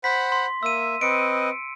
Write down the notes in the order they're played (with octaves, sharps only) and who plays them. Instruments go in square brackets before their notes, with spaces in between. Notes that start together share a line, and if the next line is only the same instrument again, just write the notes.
[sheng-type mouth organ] C5 F#5 B5 [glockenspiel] B6
[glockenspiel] C6
[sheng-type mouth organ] A#3 E5 [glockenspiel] E6 D#7
[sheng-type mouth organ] C4 B4 D#5 [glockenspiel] C#7 D7